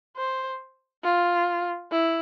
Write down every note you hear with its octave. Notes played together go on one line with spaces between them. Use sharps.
C5
F4
E4